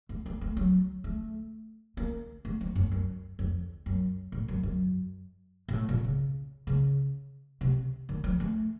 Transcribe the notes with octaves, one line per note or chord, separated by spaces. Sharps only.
A3
A#3
A3
F#3
A3
A#3
A3
F3
F#2
F#2
F2
F#2
A2
F#2
F#2
A#2
A2
A#2
C#3
C#3
C3
D#3
F3
A3